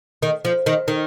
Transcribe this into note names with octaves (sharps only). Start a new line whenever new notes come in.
D#3
F3
D#3
D#3